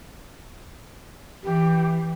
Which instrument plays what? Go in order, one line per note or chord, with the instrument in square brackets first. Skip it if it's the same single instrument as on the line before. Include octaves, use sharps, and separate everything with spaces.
[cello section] E3 [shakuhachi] G4